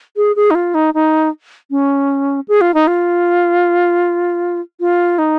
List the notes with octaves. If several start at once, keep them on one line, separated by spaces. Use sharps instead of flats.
G#4
G#4
D#4
F4
D#4
D#4
C#4
G#4
F4
D#4
F4
F4
D#4